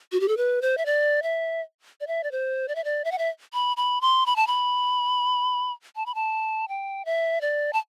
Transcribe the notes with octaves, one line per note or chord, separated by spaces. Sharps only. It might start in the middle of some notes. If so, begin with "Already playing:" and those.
F#4
G4
A4
B4
C5
E5
D5
E5
D5
E5
D5
C5
D5
E5
D5
E5
F#5
E5
B5
B5
C6
B5
A5
B5
A5
B5
A5
G5
E5
D5
A5